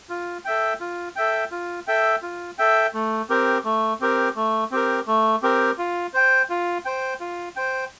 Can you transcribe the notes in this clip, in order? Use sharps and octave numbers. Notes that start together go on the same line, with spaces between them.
F4
A4 E5 G5
F4
A4 E5 G5
F4
A4 E5 G5
F4
A4 E5 G5
A3
C4 G4 A#4
A3
C4 G4 A#4
A3
C4 G4 A#4
A3
C4 G4 A#4
F4
C5 G5
F4
C5 G5
F4
C5 G5